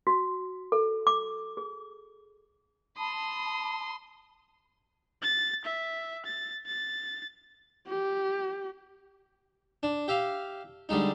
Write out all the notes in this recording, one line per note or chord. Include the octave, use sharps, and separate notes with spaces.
F#4
A4
D6
G#4
A5 B5 C6 D#6
A6
E5
A6
A6
G4
D4
G4 E5 F5
D3 G3 G#3 D#4